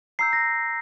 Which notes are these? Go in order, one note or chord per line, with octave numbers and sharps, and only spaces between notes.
A#5 E6 G6 C7
A#6